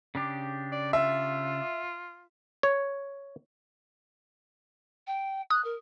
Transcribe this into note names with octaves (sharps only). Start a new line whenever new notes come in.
C#3 D4 G4
D5
F4 E5
C#5
G5
D#6 F#6
A#4